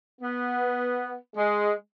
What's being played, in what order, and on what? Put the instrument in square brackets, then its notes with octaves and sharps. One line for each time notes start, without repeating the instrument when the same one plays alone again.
[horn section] B3
G#3